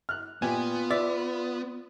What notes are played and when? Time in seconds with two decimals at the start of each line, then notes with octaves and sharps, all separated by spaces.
0.09 F6 F#6
0.42 A#2 B3 F4 G4 G#5
0.91 D5 E5